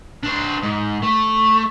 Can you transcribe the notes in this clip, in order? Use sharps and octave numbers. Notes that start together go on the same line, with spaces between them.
D4 C5
G#2
A3